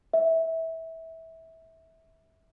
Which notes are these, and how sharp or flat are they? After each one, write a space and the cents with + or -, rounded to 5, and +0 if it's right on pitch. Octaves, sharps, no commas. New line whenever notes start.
E5 -20